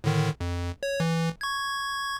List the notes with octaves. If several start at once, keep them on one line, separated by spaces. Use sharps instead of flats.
A2 D3 D#3
F2
C#5
E3
C#6 G#6